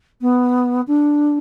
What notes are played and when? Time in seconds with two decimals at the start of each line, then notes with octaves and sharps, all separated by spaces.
0.21 B3
0.87 D4